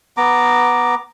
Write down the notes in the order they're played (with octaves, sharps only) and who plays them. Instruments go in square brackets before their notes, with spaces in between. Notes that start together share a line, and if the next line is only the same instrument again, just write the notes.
[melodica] B3 A#5 D6